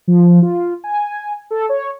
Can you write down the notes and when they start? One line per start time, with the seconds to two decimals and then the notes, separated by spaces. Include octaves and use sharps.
0.08 F3
0.42 F4
0.84 G#5
1.51 A4
1.69 C#5